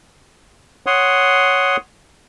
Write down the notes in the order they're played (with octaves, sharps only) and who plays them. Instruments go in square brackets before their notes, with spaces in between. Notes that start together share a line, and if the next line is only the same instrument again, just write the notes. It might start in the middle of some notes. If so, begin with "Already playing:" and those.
[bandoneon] C#5 F#5 C6 D#6